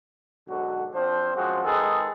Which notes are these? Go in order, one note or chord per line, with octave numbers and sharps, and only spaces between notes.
B1 G#2 D3 F#4
F3 C4 D4 C5
F#2 F3 G#3 C4 F#4
D#3 G#3 G#4 A4 B4